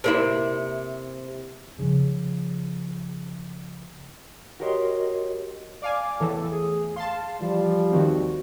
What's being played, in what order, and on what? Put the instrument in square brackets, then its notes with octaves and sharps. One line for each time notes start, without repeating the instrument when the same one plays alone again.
[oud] C3 A#3 E4
[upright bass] C#3 F3
[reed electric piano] F#4 G4 A#4 C#5 D#5 C6
[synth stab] D5 F5 G#5 [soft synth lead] D6
[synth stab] E2 A2 E3 [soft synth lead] A4
[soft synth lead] G#4
[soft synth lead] F5 [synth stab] A5 C6
[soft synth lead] E3 [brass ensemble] F3 G3
[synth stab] D#2 D#3 C4 [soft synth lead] F#4